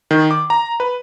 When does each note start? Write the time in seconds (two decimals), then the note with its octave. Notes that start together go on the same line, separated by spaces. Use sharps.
0.11 D#3
0.31 D6
0.50 A#5
0.80 B4